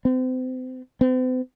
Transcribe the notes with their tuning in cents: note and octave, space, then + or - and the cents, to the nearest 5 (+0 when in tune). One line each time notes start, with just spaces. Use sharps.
C4 -35
C4 -45